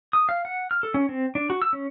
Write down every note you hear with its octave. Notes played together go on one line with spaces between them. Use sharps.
D#6
F5
F#5
F6
A4
C#4
C4
D4
F#4
E6
C#4